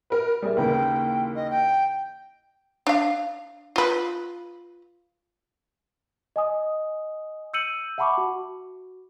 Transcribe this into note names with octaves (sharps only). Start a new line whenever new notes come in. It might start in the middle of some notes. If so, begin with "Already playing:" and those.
A#4 B4
G3 G#4 A#4 E5
D#2 C#3 E3 A#4 B4 G5
D#5
G5
D4 F5
F4 B4
D#5 G#5 D#6
E6 G6 C#7 D#7 F#7
E5 F#5 A5 B5 C#6 D6
F#4